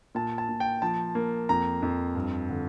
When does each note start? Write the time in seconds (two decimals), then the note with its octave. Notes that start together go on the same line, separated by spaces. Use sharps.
0.15 A#2 A5
0.38 A5
0.49 A#2
0.60 G5
0.82 F3 A5
1.15 A#3
1.49 F2 A#5
1.82 F2
2.15 G2
2.49 D3